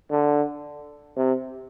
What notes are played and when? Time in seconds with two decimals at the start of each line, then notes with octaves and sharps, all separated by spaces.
0.11 D3
1.17 C3